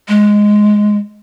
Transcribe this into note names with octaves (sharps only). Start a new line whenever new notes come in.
G#3